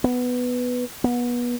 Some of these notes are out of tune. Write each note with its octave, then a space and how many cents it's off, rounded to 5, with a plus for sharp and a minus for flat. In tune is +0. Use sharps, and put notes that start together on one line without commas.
B3 +5
B3 -25